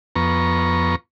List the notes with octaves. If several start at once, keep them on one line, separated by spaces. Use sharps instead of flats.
F2 B3 A#5 C#6